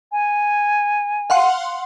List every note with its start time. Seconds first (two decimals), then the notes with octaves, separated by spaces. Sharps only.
0.12 G#5
1.30 F5 F#5 C6